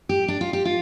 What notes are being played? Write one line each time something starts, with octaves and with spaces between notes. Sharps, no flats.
G4
D4
F4
G4
F4